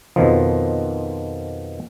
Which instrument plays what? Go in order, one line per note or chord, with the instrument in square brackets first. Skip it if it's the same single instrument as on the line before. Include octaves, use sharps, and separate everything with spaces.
[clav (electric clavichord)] F2 B2 D#3 F3